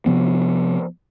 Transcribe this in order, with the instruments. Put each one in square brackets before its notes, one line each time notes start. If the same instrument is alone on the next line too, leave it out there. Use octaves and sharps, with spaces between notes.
[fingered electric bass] C3 F3 B3